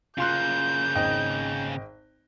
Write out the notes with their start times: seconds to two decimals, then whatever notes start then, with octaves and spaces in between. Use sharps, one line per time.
0.18 C#3 A#3 F4 C6 F#6 G6
0.95 G#1 D#5 G5